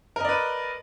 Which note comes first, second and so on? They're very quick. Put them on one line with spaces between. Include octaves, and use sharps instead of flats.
A#4 D#5 D5 B4